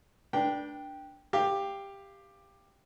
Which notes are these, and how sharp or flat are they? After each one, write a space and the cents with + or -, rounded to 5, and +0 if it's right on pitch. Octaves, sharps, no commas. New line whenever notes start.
D4 +0 B4 -35 G5 +0
G4 +10 F5 -15